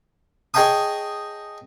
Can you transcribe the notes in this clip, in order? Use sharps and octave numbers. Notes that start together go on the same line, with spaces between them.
G#4 C#5 D#5 G5 A5 D#6